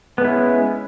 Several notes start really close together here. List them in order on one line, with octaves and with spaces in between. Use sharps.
B3 G#3 E4 C#4